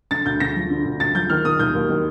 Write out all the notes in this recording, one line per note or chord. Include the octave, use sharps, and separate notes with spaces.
D3 A6
D2 G6
D2 A#6
F3
D3
D2
D2 A6
F3 G6
D#3 F6
D#3 D#6
D#2 G6
D#2
D#3